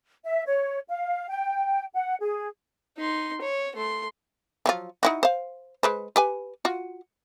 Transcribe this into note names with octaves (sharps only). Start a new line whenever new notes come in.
E5
C#5
F5
G5
F#5
G#4
D#4 C6
C#5
A3 C6
F3 F#3 F4
D#4 E4 F#4
C5 F5
G#3 B4 C5
G4 B4 G#5
F4 F#4